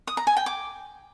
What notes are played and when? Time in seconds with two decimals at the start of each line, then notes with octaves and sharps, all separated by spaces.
0.07 D#6
0.17 A#5
0.27 G#5
0.37 G5
0.46 D6